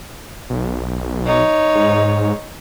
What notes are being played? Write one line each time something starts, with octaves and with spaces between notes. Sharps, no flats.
B1
D#4 C#5
G#2